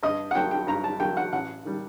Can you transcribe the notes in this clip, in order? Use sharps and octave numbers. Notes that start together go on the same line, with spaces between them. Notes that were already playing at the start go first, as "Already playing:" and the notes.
G2 D#5
F#5
F#3 A#3 G5
G5
G2 A#5
A5
F#3 A#3 G5
F#5
A1 F#5
D#3 G3